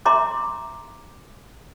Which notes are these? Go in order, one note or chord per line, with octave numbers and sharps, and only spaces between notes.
E5 A#5 C6 D6